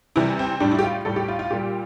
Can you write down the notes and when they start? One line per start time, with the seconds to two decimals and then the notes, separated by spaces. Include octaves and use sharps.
0.16 C3 E3 G3 E4
0.39 C4
0.60 A2 G3 D4
0.71 E4
0.79 G4
0.84 F4
1.05 A2 G3 A4
1.16 G4
1.28 F4
1.39 F4
1.51 A#2 G3 G4